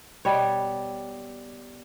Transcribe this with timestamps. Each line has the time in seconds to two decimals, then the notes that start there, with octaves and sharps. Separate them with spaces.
0.25 B2 G3 C#5